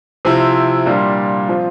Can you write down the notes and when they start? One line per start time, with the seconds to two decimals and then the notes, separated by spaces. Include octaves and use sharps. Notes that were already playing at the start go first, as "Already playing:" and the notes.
0.25 C3 F3 C4 E4
0.86 A#2 G3 D4 F4
1.48 F3 C4 F4